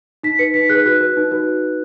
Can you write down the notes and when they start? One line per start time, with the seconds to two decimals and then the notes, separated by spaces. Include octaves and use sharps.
0.23 D#4 B6
0.39 B4 C#7
0.54 D#4 B6
0.69 G#4 F#6
0.75 B4
0.86 F#4 F#6
1.01 B4
1.17 D#4
1.31 F#4 B4